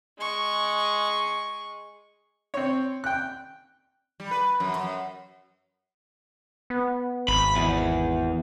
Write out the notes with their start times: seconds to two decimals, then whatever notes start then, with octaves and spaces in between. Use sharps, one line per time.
0.19 G#3 C#6
2.54 C4 C#5
3.04 G5 F#6
4.20 G3
4.31 B4
4.60 F#2
4.75 F#2
6.70 B3
7.28 G#1 B5
7.55 E2